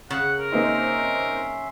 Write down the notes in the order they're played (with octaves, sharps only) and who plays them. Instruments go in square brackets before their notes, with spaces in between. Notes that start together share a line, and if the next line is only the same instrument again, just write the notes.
[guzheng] C#3 [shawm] F#5
[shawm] A#4
[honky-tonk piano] A#3 C4 D#4 [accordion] C#4 E5 C6